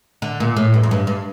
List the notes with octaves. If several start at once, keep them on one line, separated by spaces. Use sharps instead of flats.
D3
A#2
A2
G2
F2
G2
G2